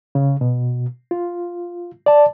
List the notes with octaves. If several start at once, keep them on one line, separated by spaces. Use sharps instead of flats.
C#3
B2
F4
D5 A5